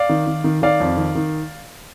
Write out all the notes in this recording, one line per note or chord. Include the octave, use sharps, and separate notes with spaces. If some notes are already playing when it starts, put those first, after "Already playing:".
Already playing: D5 F5
D#3
D#3
D#3
D#3 D5 F5
F2
D#3
D#3